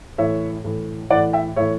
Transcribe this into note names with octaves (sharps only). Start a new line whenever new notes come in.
A2 E3 C#5 E5
A2 E3
A2 E3 D5 F#5
E5 G5
A2 E3 C#5 E5